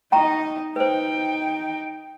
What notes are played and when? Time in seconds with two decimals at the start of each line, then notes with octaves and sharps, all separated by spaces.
0.12 D#4 D#5 G5 A#5 C#6
0.76 D#4 B4 C5 G5